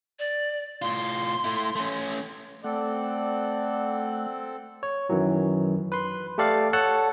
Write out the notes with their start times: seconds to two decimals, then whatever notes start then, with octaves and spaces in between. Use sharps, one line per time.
0.19 D5
0.82 A2 F4 C6
1.44 A3 E4
1.76 A3 C#4
2.64 A3 C4 A4 D5 F#5
4.83 C#5
5.09 F#2 D#3 E3 F#3
5.92 B4 C6
6.38 A3 G4 A4 D5 F5
6.73 A4 C#5 F#5 A5 F#6